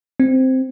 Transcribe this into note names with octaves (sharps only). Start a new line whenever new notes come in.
C4